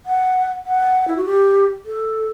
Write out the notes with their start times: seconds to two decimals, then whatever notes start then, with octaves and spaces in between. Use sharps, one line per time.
0.06 F#5
0.65 F#5
1.08 E4
1.17 F#4
1.25 G4
1.85 A4